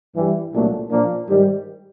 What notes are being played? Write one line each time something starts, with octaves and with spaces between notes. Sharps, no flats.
G2 E3 G3
C2 A#2 F#3 A3 D4
A#2 F3 A#3 D4
G#2 D#3 G3